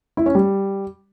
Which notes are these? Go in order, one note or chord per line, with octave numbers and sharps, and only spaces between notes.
E4
C#4
G3